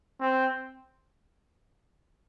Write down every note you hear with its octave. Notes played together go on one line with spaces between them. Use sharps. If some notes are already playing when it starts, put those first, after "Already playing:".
C4